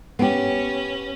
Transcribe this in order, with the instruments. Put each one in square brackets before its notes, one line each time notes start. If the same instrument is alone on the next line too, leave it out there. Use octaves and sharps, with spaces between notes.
[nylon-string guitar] B3 G4 [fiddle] C#4